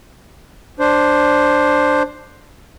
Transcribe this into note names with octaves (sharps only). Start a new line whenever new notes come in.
D4 C5